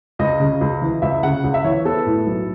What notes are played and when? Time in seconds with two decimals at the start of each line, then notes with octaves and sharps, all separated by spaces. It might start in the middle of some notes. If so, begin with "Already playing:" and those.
0.19 C#2 D#5
0.40 C#3
0.61 C#2
0.82 E3
1.02 C#2 E5
1.23 C#3 F#5
1.44 C#2
1.54 E5
1.64 E3 C#5
1.85 B3 A4
2.06 A2
2.27 B1